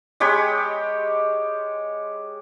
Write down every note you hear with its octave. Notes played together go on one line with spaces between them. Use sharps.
G#3 G4 C#5 B5